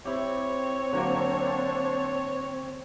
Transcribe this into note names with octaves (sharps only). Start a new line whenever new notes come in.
C4 E4 G4 C#5
D3 F#3 A#3 D4 C5